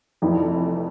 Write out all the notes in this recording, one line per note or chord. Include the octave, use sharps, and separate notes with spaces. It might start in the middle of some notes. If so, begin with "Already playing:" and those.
F1 F2 E3